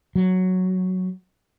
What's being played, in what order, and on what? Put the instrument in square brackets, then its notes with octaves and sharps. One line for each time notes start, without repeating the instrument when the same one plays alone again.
[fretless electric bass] F#3